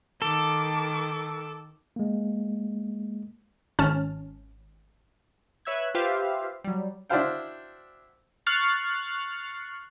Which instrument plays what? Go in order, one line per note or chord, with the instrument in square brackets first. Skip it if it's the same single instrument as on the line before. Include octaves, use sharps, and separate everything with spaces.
[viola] D#3 D6 [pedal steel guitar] A4
[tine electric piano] G#3 A#3
[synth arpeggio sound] G#1 C#4 A5 F6
[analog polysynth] B4 C#5 E5 E6 F#6 G#6
F4 G4 B4 C5 E5 F5
F#3 G3
[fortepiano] D4 E4 F#4 C5 F5 G5
[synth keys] C#6 F6 F#6 A6 C7